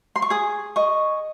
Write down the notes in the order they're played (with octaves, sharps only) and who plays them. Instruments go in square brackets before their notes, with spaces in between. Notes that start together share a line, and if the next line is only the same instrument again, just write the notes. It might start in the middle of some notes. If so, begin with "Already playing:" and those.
[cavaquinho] C6
C#6
G#4 D#6
D#5 C#6